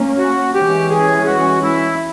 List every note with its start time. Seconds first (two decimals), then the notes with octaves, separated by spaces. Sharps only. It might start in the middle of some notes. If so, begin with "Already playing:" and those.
Already playing: A#3 C#4
0.18 F#4
0.54 E3 G#3 C#4 G4
0.90 G#4
1.26 F#4
1.63 E4